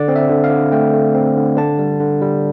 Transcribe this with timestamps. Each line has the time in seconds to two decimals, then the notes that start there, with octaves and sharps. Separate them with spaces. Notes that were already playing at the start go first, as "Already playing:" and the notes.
Already playing: D3 D5
0.08 C4
0.16 E5
0.29 D3
0.44 F5
0.51 D3
0.72 A3 G5
0.93 A3
1.15 C4
1.37 D3
1.57 D3 A5
1.79 G3
2.00 D3
2.22 G3